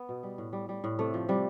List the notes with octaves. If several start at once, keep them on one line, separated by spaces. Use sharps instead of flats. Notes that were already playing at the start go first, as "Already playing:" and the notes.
Already playing: B3
B2
G3
A2
G3
G3
A2
C3 A3
F3
C3 G3